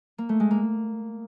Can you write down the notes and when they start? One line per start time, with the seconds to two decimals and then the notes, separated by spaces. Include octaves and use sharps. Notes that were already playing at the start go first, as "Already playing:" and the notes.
0.18 A#3
0.29 A3
0.40 G#3
0.51 A#3